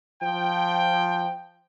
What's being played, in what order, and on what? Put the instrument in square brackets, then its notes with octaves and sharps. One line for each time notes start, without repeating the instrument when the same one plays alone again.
[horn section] F3 G5